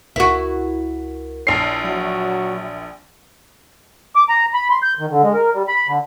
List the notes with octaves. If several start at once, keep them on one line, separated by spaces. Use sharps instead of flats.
C#2 E4 F#4 A#4
A#1 C#5 A5 F6 C7
F#3 E5
D6
A#5
B5
C6
G6
D#3
D3
G#3
A#4
G3
B5
D3